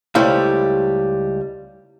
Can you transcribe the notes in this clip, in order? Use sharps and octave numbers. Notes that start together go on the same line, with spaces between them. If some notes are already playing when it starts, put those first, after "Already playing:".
C#2 G3 A3 E4 C5 F5